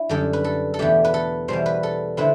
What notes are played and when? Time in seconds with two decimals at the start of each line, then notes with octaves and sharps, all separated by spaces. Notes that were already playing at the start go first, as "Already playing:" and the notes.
Already playing: D4 E4
0.09 F#2 D3 G3 A4
0.33 B4
0.44 A4
0.74 A4
0.79 E2 B2 A3 D4 G4
1.05 B4
1.14 A4
1.48 E2 B2 G3 C5
1.66 B4
1.83 A4
2.17 D3 A3 C4 E4 B4